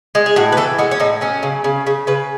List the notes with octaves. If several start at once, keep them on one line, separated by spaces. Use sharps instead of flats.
G#3
G#4
A2 F#4
B4
E3 A4
G#3 F#4
C#4
A2 D#4
F#3 C#4
C#3
C#3
C#3
C#3 B4